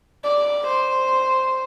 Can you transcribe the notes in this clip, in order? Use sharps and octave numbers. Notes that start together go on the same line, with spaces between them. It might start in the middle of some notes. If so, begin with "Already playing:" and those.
D5
C5